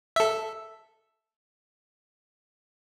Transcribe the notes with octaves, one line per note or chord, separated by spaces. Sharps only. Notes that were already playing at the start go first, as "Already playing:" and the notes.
A4 E5